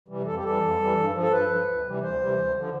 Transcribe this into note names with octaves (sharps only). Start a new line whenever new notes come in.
C3 E3 G3
F2 A4
G4
E3 G3 A4
F2
E3 G3
G2
F3
A4
G2 B4
F3
D2
C3 E3 G3
D2 C5
C3 E3 G3
D2
D3 F3